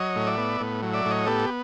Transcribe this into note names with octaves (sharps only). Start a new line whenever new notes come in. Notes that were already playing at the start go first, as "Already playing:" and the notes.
Already playing: F#3 C#5 D#5
A2
D5 E5
B3
A2
F#3
D5 E5
A2
C#5 D#5
B3 G4 A4